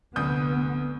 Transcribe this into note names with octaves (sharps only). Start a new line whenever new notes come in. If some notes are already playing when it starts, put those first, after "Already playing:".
F1 D2 B3 D#6 G6